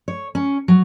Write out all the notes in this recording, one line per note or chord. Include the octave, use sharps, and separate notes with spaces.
C#5
C#4
F#3